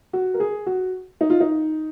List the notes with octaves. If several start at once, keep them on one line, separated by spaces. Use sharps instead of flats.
F#4
A#4
G#4
F#4
D#4
F4
D#4